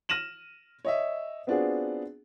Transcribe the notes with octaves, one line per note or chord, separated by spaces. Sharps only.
F6 A#6 D#7 E7 F#7
C#5 D#5 E5
B3 C4 D4 F4 F#4 G#4